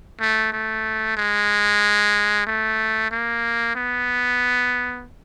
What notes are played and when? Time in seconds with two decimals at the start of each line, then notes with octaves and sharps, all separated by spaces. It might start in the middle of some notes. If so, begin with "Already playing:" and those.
0.21 A3
0.53 A3
1.17 G#3
2.47 A3
3.11 A#3
3.75 B3